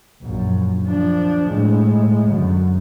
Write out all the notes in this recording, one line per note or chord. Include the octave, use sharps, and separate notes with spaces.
A#1 F#2
F3 D4
A2 G#3
F#2 D3